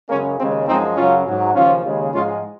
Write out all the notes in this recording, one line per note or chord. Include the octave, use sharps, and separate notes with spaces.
F#2 C#3 G#3 A#3 C#4
D#2 C#3 G#3 C4
F#2 F3 G#3 C4 D#4
F#2 C#3 F#3 C#4 F4
G#2 F#3
D#2 C#3 F3 C#4 F4
D#2 C#3 G#3
G#2 F3 G#3 C#4 F4